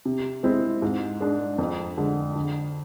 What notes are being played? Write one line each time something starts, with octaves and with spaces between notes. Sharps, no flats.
C3
G#3 C4 E4
G#2
G#3 D4
F2
D3 G#3
D3